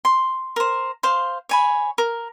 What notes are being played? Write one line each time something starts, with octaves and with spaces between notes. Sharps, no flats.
C6
A#4 C5
C5 F5 C6
C#5 G#5 B5
A#4